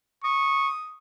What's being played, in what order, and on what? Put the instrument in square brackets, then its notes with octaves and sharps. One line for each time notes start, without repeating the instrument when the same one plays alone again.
[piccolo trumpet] C#6 [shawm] D#6